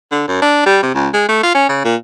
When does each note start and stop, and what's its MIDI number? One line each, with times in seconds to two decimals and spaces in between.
0.12 0.24 50
0.28 0.40 42
0.42 0.66 62
0.66 0.78 55
0.83 0.93 48
0.94 1.08 37
1.14 1.25 56
1.28 1.41 57
1.43 1.52 65
1.54 1.68 61
1.69 1.82 49
1.85 1.95 46